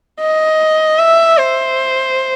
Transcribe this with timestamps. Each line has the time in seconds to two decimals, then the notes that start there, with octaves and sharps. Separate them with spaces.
0.21 D#5
0.99 E5
1.38 C5